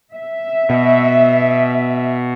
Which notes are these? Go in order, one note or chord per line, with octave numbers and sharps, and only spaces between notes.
E5
B2